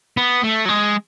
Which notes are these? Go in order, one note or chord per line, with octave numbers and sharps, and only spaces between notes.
B3
A3
F#3
G#3